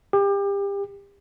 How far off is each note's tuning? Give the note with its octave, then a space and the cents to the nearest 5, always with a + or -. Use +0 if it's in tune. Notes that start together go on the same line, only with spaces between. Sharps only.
G4 +30